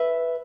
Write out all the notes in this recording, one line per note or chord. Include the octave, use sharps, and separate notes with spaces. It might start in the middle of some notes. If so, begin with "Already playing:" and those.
Already playing: B4 E5